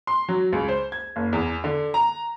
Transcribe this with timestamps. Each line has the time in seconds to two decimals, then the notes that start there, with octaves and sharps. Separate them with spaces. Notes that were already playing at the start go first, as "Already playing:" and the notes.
0.07 C6
0.29 F#3
0.53 C#2
0.68 C5
0.92 G#6
1.16 F#1
1.33 E2
1.64 D3
1.94 A#5